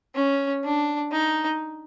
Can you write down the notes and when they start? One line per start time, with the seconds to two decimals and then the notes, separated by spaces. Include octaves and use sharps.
0.16 C#4
0.64 D4
1.12 D#4